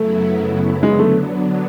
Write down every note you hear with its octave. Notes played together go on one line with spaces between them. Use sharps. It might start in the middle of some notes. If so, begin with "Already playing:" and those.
Already playing: F#2 C#3 F#3 A3 B3 E4
D3 F#3 G#3 B3 D4
A3